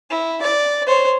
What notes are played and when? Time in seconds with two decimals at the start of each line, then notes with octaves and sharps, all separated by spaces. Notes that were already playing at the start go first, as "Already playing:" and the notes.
0.10 E4
0.42 D5
0.87 C5 C#5